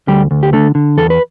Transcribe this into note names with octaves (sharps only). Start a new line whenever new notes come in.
D2 G3 G4
D2
G4
D3 A3 A4
D3
E2 A4
B4